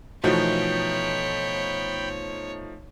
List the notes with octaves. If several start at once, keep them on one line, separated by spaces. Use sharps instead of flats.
B2 E3 F3 A3 D#4 C#5 G5 B5